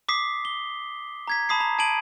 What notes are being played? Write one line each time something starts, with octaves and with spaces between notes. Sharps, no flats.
D6 D#6 B6 C7
G7
A#5 G#6 B6
A5 B5 D#6 B6 C7
A#5
A5 G#6 D7 D#7 F#7